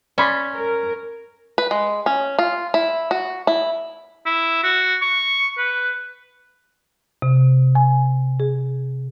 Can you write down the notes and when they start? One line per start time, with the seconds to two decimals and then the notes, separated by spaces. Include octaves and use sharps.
0.18 C#4 D5 B5 C6
0.54 A#4
1.58 B4
1.71 G#3
2.06 C#4
2.39 F4
2.74 E4
3.11 F#4
3.47 E4
4.26 E4
4.64 F#4
5.02 C#6
5.58 B4
7.22 C3
7.75 G#5
8.40 G#4